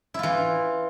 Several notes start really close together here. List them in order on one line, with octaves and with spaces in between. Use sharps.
E4 F4 E3